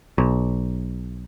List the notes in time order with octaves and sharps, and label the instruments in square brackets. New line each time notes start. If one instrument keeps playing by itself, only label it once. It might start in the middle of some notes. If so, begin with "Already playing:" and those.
[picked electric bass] B1